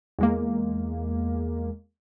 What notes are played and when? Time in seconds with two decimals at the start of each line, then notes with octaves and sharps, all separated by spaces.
0.19 E2 G#3 A#3